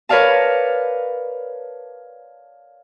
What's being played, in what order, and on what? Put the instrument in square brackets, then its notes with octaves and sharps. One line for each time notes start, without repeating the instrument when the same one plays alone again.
[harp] A#4 B4 C#5 D5 F5 A5